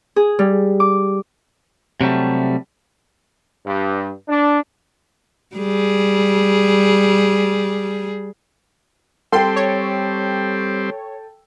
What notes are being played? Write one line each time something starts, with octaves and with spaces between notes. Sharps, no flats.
G#4
G3
D6
C3 F#3 G3 A3
G2
D4
G3 G#4
G3 C4 A4 G5 C6
C#5